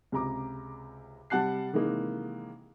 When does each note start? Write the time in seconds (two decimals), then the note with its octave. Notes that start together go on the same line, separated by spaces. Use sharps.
0.12 C#2 C3 A#5 D6
1.30 C3 G3 F#5 A5 F#6 C7
1.73 C3 D#3 E3 G#3 A#3